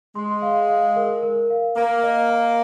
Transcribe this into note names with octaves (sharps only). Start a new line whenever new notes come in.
G#3 C6
F5
F5
A#4
A#4
F5
A#3 A#5
D#5
A#5